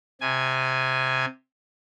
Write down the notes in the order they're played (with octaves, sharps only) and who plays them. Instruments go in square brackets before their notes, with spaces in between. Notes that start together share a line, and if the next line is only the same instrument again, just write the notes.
[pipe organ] C3 G#5